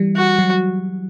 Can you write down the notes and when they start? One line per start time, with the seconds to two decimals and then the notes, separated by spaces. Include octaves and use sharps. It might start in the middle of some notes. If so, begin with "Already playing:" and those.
Already playing: E3 G3
0.16 F#4
0.39 F#3